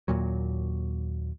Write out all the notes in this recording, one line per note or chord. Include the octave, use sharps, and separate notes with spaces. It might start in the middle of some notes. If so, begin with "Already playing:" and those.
D#2 A#2 F#3